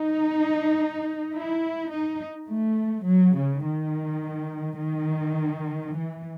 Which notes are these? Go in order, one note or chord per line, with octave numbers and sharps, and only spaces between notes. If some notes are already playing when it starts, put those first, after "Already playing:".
Already playing: D#4
E4
D#4
A3
F#3
C#3
D#3
D#3
E3